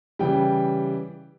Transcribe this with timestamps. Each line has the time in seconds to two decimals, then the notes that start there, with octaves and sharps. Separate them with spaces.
0.19 C#3 E3 G3 G5